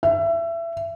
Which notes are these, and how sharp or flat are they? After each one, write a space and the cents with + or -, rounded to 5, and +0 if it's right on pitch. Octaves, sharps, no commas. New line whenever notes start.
E5 +25